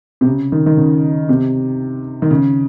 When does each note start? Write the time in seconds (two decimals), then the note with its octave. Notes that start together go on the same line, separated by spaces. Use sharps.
0.21 C3
0.27 C#3
0.52 D#3
0.66 D#3
0.77 C#3
1.29 C3
2.22 D#3
2.31 C#3